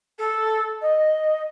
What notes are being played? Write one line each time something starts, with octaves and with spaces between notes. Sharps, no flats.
A4
D#5